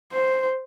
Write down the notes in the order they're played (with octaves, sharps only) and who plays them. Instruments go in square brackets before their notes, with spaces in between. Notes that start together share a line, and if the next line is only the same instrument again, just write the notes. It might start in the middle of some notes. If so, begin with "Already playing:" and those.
[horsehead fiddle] C5